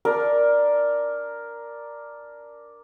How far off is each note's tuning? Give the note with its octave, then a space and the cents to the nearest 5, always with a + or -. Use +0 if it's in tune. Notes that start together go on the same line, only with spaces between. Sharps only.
D4 +0 A#4 +5